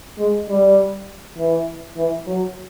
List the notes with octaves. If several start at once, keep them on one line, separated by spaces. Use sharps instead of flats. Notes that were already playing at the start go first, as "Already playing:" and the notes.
G#3
G3
E3
E3
F#3